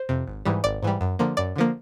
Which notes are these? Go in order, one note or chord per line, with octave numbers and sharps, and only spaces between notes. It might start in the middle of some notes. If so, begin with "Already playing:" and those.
Already playing: C5
F2 C3
G#1
G#2 E3 G3
G#1 D5
G#2 E3 G3
F#2
D3 F3 A#3
F#2 D5
D3 F3 A#3